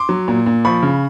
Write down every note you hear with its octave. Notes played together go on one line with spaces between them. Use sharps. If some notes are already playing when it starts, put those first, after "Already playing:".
Already playing: C6 D6
F#3
A#2
A#2
F3 B5 C#6
C#3